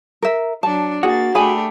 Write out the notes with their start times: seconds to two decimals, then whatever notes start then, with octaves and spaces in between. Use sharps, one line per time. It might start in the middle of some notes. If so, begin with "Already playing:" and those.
0.22 A#4 E5
0.63 F#3 D4 A5
1.03 A#3 F#4 G#4 A6
1.35 A3 D4 G4 G#4 G#5 B5